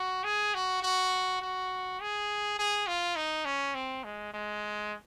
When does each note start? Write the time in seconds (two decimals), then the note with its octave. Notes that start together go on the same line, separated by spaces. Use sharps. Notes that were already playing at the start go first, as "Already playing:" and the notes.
Already playing: F#4
0.24 G#4
0.54 F#4
0.83 F#4
1.42 F#4
2.00 G#4
2.59 G#4
2.87 F4
3.16 D#4
3.45 C#4
3.75 C4
4.04 G#3
4.34 G#3